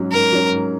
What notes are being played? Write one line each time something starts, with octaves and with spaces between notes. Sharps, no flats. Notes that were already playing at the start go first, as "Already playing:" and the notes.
Already playing: G#2 F#3 C#4
G#2 A#4
F#3 C#4
G#2